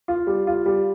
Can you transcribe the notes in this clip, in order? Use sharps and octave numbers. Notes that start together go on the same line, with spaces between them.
F4
G3
F4
G3